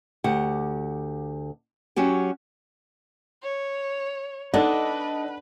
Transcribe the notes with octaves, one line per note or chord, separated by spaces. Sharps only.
D2 G4 F#5
F#3 C#4 F#4 G4
C#5
D4 D#4 A4 B4 D#5 F#5